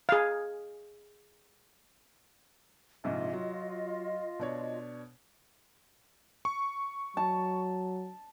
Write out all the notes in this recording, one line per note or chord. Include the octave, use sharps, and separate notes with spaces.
G#4 F5
A#1 G#2 C3 F4 D#5
F#3
B2 D4 C#5
C#6
F#3 A5